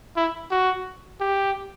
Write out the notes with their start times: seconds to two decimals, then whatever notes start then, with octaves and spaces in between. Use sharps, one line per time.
0.16 E4
0.51 F#4
1.21 G4